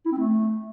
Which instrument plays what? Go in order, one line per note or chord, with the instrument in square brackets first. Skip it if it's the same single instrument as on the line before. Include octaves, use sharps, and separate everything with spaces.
[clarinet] E4
C4
A3